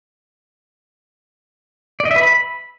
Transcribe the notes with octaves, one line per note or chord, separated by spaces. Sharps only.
D5
D#5
E5
B4
B5